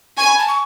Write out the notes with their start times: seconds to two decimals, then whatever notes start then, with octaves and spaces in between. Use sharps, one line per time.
0.18 G#5 C#6
0.28 B5
0.38 A5
0.48 C#6